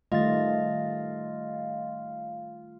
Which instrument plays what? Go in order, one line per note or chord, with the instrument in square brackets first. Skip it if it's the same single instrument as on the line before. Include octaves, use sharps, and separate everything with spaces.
[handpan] D#3 G3 A3 [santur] F4 [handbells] D#5 A6